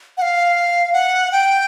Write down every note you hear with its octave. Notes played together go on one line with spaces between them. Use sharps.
F#5
F5
F#5
G5